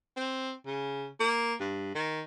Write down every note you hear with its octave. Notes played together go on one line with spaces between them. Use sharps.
C4
C#3
A#3
G2
D#3